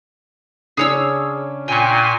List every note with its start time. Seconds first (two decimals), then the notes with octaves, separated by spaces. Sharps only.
0.77 C#3 C#4 D4 G#4 C#5 E6
1.68 A#2 G5 G#5 C#6